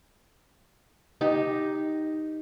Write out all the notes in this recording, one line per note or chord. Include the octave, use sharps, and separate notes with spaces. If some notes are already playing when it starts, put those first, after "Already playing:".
D#4 G4